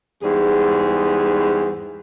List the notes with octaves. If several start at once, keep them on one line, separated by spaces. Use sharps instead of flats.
E2 G#2 G3 G#4